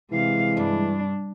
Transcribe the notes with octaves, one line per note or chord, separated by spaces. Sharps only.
C3 E3 G#3 F5
G2 D4